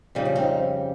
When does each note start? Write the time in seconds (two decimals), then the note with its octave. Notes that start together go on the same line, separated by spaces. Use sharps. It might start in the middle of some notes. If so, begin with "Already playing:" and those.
0.15 F2 C#3 G3 D#4
0.25 C#4
0.36 C4 D#4